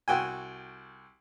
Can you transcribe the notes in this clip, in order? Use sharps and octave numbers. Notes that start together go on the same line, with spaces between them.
C2 F#4 G5 G#5